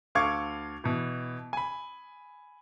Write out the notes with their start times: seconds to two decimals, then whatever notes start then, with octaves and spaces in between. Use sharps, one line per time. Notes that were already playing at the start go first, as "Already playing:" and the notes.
0.15 D2 A4 F5 C#6 D6 G#6
0.84 B2 E3
1.53 G#5 B5